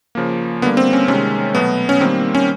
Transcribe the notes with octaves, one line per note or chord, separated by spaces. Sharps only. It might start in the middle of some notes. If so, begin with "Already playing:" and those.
C#3 F3 A#3
D3 G3 A#3 B3
C4
C#4
C3 D#3 G#3 C#4
B2 F#3 A3 B3
C#4
D#3 G3 A#3 C4
C#4